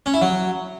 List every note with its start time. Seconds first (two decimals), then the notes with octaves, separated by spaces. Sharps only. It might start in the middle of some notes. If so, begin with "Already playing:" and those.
0.06 C#4
0.14 E4
0.21 F#3